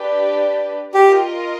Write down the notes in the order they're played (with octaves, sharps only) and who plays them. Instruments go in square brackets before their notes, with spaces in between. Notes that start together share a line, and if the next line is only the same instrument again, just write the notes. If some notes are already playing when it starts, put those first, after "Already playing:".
Already playing: [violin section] D4 G4 B4 D5
[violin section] F4 A#4 D#5 [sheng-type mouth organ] G4